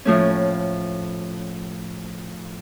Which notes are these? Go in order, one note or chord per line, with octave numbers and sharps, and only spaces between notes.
A2 F3 A3 C#4